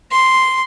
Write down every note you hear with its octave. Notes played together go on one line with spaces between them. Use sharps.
C6